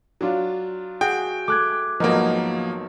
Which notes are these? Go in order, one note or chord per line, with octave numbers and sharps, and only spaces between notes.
F#3 D4 F4
F#4 G#4 G5
A3 D6 F#6 G#6
G#1 F3 F#3 A#3 B3 D#4 A#4